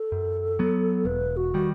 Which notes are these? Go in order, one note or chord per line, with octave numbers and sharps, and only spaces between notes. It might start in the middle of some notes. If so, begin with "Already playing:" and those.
Already playing: A4
F#2
F#3 B3
E1 B4
F#4
D#3 G3